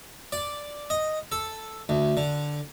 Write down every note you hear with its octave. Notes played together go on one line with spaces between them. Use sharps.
D5
D#5
A4
D2
D3